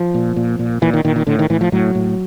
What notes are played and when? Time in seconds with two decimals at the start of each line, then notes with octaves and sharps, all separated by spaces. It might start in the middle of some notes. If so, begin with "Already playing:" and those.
Already playing: F3
0.14 A#2
0.36 A#2
0.59 A#2
0.82 A#2 E3
0.94 D#3
1.05 A#2 D#3
1.16 D#3
1.27 A2 D3
1.39 D#3
1.50 A2 E3
1.61 F3
1.72 A2 F#3
1.95 A2